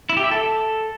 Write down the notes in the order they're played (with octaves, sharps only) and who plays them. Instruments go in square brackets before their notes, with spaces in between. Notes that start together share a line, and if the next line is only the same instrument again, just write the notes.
[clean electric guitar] E4
G4
E5
A4